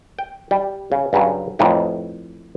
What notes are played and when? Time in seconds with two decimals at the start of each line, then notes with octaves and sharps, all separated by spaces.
0.19 G5
0.51 G3
0.92 C#3
1.13 G2 C#3 F#3
1.59 F2 A2 E3 A3 D#4 E4